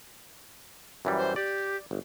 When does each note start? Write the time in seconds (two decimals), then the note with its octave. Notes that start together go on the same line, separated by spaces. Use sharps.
1.05 F#2 E3 G3
1.18 C5
1.36 G4 D5
1.91 G1